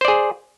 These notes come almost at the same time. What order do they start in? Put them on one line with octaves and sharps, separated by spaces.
C5 D5 G#4